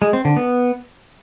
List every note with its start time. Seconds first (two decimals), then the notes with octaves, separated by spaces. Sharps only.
0.02 G#3
0.13 C4
0.25 D3
0.37 B3